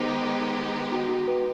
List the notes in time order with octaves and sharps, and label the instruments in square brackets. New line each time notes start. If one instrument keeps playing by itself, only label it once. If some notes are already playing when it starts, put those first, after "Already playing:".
Already playing: [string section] D#3 G#3 B3 D#4 G4 [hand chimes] C5
[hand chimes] F#4
F#4
B4